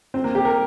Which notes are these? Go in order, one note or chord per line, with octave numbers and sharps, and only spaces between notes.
C4
A#3
G4
A#4